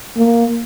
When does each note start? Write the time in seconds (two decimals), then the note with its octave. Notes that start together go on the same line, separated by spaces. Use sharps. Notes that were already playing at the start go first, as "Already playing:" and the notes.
0.17 A#3